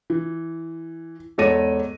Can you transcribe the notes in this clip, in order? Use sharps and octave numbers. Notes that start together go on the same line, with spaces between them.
E3
E2 G#2 A4 C#5 A#6 D#7